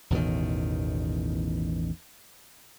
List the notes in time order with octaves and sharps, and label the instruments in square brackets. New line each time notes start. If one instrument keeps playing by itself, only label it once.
[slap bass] A1 E2 B2 D#3